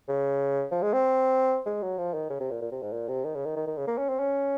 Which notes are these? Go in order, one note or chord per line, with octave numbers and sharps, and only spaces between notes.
C#3
F3
G#3
C4
G#3
F#3
F3
D#3
C#3
C3
A#2
A#2
C3
G#2
A#2
C3
D#3
C#3
D#3
D#3
D#3
C#3
A#3
C#4
C4
C#4